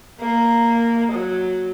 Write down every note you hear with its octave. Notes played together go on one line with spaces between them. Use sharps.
A#3
F#3